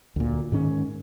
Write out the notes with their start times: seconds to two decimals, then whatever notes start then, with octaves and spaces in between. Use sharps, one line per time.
0.16 D2 A#2
0.52 G#2 D#3 C#4